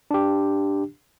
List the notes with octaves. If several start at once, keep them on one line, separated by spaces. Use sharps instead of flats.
D4 G4